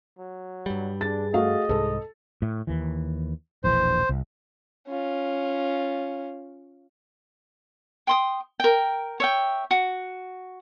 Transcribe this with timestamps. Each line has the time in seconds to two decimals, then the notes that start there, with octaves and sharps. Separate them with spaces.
0.19 F#3
0.66 G2 G3
1.01 D4 G#4 A6
1.33 A3 F#4 D#5 F5
1.69 C2 G#2 A4
2.42 A2
2.67 D#2 E3
3.64 E1 A#1 E3 C5
4.09 C2
4.88 C#4 F4
8.07 G5 C6 D#6
8.60 A#4 G5
9.20 C#5 E5 G5
9.71 F#4